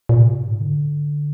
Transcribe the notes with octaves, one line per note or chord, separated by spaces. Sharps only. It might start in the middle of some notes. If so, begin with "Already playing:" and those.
A#2
C3
G#2
D3